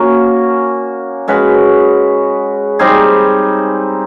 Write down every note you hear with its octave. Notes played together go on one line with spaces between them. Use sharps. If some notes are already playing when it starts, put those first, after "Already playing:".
Already playing: A#3 C#4 F#4
G#3 C#4 F#4 B4
G3 C4 D#4 G#4